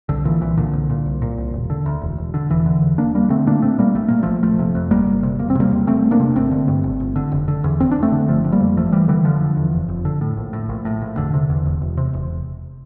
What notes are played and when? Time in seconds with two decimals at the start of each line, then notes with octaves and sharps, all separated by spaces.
0.09 C2 D3
0.25 A#2 E3
0.41 C2 E3
0.57 A#2 D3
0.73 C2
0.90 A#2
1.06 C2
1.22 A#2
1.38 C2
1.54 E1
1.70 D3
1.86 D2
2.02 E1
2.18 E1
2.34 D3
2.50 E1 E3
2.66 D3
2.82 E2
2.98 E1 A#3 D4
3.14 E1 G3 A#3
3.30 D3 A3 C4
3.47 A#2 A#3 D4
3.62 A#1 A3 C4
3.78 A#2 G3 A#3
3.95 A#1 A3
4.08 A#2 A#3
4.23 A#1 F3 A3
4.43 G1 F3 A3
4.59 C3
4.75 F2
4.91 G1 G3 A#3
5.07 G1
5.23 C3
5.39 E1 A#3
5.50 C4
5.55 C3 G3 A#3
5.71 E2
5.87 E1 A3 C4
6.04 E1
6.11 A#3 D4
6.20 C3
6.36 G1 A3 C4
6.51 D3
6.68 G2
6.84 G1
7.00 G1
7.16 D3
7.32 F1
7.48 D3
7.64 E2
7.80 F1 C4
7.91 F1 D4
8.03 A3 C4
8.12 D3
8.28 G1 F3 A3
8.44 D3
8.52 G3 A#3
8.60 F2
8.76 G1 F3 A3
8.92 G1 E3 G3
9.08 D3 E3 G3
9.25 F1 D3 F3
9.41 D3
9.57 E2
9.73 F1
9.89 F1
10.05 D3
10.21 A2
10.37 A#1
10.53 A2
10.69 A#1
10.85 A2
11.02 A#1
11.17 E1 D3
11.34 C3
11.50 E2
11.66 E1
11.81 E1
11.97 C3
12.14 E1